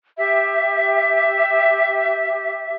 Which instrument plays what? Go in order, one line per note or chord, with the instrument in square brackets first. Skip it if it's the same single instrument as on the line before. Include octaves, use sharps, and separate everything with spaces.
[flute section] G4 E5